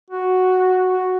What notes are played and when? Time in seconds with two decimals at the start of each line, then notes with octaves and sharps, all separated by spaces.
0.10 F#4
0.90 F#4